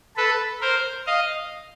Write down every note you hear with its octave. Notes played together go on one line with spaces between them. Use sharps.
A4 B4
A#4 C5
D#5 F5